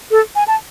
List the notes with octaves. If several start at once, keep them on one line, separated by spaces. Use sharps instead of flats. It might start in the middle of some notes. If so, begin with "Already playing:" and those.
A4
G#5
A5